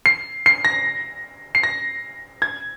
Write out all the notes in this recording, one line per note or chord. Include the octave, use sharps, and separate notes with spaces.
C7
C7
A#6
C7
A#6
G#6